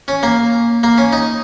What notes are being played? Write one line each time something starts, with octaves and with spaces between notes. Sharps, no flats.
C#4
A#3
A#3
C#4
D#4